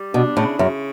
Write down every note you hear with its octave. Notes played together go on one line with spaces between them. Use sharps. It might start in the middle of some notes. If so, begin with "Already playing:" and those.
Already playing: G3
B2 D4
A2 C#3
F#2 C#3